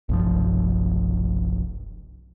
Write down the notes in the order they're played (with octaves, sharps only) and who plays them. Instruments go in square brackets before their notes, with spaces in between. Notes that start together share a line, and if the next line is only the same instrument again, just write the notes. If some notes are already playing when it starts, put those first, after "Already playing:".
[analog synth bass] F1 [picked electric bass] B1 G2 F3